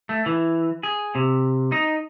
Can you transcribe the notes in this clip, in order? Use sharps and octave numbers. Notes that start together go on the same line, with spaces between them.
A3
E3
G#4
C3
D#4